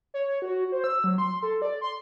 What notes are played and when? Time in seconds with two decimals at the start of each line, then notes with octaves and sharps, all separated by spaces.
0.14 C#5
0.42 F#4
0.72 C5
0.84 E6
1.04 F#3
1.18 C6
1.43 A4
1.62 D5
1.81 C6